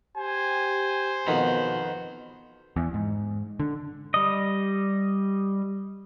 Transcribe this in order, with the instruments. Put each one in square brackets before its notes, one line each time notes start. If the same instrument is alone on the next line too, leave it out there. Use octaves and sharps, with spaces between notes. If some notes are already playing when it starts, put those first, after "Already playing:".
[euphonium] G4 [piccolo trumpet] C5 [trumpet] G#5
[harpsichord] F2 D#3 B3 [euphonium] B2
[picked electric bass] E2
G#2
D3
[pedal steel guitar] G3 D#5